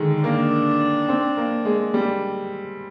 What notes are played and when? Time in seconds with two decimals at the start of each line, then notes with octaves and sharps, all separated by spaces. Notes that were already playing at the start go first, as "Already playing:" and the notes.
Already playing: D3 D#3 G#3
0.24 A#3 D4
1.09 C4
1.37 A#3
1.65 G#3
1.94 G3